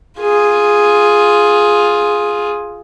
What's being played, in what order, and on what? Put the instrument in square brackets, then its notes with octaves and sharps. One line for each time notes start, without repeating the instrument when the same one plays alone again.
[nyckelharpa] F4 G#4